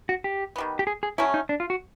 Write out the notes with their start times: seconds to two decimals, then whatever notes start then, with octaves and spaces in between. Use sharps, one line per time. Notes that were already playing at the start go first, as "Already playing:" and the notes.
0.09 F#4
0.24 G4
0.56 D#3 G3 B3
0.79 G4
0.87 G#4
1.03 G#4
1.18 F#3 A3 C#4 E4
1.34 D#4
1.49 D4
1.60 F4
1.70 F#4